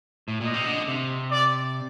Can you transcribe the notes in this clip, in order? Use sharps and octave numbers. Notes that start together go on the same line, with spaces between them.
A2
A#2 D#5
C3
D3
C3
D5